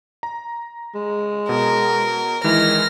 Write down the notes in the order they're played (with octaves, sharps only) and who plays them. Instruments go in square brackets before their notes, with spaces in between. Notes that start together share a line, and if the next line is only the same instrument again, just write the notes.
[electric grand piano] A#5
[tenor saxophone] G#3
[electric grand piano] B2 [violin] A#4
[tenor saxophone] D#3 [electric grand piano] E3 G#3 E4 [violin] F6 A#6